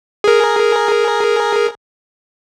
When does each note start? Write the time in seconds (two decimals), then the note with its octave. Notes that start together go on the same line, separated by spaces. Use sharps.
0.24 G#4 A#4